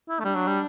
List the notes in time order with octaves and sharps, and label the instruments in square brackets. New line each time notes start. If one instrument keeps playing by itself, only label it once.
[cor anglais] E4
A3
[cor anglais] G3 [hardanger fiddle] D4
[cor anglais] F#3
G3